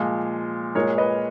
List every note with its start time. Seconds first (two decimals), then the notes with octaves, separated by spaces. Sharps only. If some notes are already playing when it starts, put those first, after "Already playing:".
Already playing: A#2 F3 G#3
0.75 A#2 G#3 A#4 C#5
0.98 B4 D#5